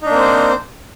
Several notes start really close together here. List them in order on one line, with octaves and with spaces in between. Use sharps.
D#4 D4 A#3 C4 C5